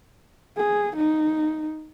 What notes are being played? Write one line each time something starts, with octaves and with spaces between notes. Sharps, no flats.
G#4
D#4